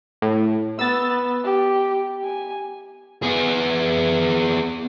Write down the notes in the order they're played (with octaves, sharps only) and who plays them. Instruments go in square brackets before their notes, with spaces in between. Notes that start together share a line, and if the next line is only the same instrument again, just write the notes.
[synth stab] A2
[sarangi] B3 [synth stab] E6 A6
[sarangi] G4
G#5
[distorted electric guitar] B3 G#4